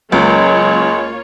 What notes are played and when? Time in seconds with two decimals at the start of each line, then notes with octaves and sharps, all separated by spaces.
0.12 C#2 F#3 G#3 A#3 F4 C#5